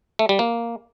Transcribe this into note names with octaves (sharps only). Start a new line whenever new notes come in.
A3
G3
A#3